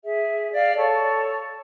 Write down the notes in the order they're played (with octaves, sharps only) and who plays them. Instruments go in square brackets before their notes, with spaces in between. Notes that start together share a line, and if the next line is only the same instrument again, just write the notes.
[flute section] G#4 E5
D5 F5
A4 C#5